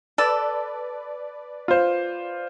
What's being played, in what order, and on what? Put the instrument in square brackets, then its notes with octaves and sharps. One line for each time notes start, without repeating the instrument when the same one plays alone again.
[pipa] A4 [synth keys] B4 D5
[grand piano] F4 C5